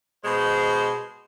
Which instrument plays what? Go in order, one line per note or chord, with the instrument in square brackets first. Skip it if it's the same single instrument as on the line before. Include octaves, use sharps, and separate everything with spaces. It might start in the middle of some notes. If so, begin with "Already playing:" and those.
[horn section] B2 G#3 C5